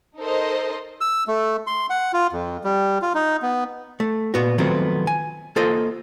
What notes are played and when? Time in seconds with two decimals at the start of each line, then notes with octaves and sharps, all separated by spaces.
0.18 D#4 A4 A#4 C5 D#5
1.01 E6
1.27 A3
1.67 C6
1.90 F#5
2.13 F4
2.33 F2
2.64 G3
3.02 F4
3.14 D#4
3.42 B3
4.00 A3
4.34 A#2 B3 F#4
4.58 D#3 F3 F#3 A3 B3 C4
5.07 G#5
5.56 A#3 F4 A4 C5 D#5